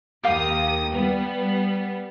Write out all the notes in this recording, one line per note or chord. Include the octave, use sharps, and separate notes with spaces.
D#2 G4 F5 D6 D#6
G3 B3